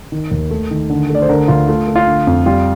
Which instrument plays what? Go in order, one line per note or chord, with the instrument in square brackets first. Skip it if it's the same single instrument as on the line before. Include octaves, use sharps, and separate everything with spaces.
[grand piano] D#3
D#2
A3
D#3
D3
A3 D5
C5
D3 A#4
D2 F4
A3 F4
A3
F4
D3
F2
G3 F4